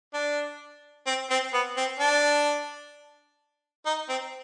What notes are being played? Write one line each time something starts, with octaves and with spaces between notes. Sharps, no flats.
D4
C4
C4
B3
C4
D4
D#4
C4